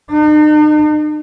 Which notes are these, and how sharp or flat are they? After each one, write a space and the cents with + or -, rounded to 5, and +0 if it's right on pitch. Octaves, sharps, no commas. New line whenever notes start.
D#4 -45